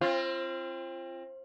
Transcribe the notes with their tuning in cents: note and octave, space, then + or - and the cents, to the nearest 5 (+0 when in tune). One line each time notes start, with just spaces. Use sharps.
C4 +25 F4 -25